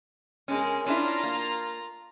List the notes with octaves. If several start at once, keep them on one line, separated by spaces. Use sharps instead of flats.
B2 G#3 C#4 A#4
C#4 D4 E4 F4 A#5
A#3